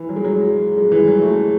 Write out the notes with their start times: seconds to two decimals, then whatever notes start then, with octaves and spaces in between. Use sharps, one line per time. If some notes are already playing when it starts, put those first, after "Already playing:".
Already playing: E3
0.09 F#3
0.16 G#3
0.24 F#3
0.77 G#3
0.92 E3
1.08 F#3
1.22 A3